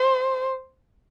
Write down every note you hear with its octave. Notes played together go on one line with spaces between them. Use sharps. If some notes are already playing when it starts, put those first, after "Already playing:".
Already playing: C5